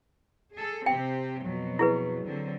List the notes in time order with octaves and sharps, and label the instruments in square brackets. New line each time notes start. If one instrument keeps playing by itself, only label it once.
[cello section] G#4 A4
[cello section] C3 C4 G4 [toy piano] G5
[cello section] F2 B2 F#3
[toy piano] E4 G#4 B4
[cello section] D3 F#3 C4